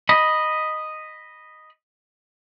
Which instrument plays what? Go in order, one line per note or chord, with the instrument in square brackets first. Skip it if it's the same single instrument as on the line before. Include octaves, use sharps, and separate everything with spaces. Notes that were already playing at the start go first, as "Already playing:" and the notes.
[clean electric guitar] D#5 B5